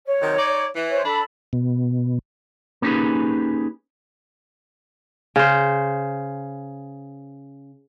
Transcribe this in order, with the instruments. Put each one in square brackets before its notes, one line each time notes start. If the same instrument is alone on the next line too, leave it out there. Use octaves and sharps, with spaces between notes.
[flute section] C#5
[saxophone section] C3 D#3 F#3
D#4 D5
E3
[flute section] C5 C#5
[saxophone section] D4 [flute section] A4 B5
[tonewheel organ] B2
[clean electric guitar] A#3 C#4 D#4 G4 G#4 B4
[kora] C#3 C5